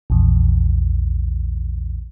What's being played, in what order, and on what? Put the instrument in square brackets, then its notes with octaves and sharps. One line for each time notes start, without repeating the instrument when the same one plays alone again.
[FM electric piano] A#1 E2